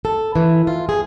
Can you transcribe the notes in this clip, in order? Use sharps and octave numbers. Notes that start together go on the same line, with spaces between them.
A4
E3
F4
G#4